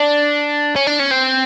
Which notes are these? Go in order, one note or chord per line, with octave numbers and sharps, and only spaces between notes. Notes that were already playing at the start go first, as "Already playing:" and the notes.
Already playing: D4
C#4
D4
C#4
C4